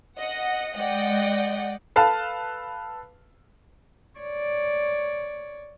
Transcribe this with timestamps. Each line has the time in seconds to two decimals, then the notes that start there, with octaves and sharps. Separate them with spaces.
0.19 D#5 F#5
0.77 G#3 D5 D#5 F#5 G5
1.96 A4 B4 F5 A5
4.19 C#5 D5